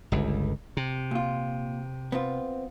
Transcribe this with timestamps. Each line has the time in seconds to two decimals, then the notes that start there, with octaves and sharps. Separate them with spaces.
0.12 G1 C#2
0.77 C3
1.11 A#2 F4
2.12 B3 C4 F4